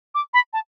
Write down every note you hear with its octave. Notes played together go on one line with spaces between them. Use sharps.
D6
B5
A5